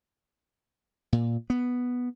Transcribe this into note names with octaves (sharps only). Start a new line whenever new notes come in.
A#2
B3